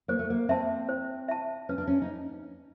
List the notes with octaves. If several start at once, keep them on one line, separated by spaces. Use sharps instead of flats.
A#3 C5
A3
A#3
C4 E5 A5
C5
E5 A5
C#4 B4
D4
C#4
D#4